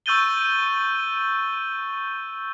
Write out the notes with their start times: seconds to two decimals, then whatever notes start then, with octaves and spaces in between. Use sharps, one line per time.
0.06 C#6 E6 G6 A6 D#7 G7